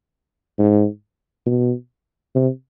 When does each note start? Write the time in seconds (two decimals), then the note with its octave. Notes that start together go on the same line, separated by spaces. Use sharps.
0.59 G#2
1.46 B2
2.35 C3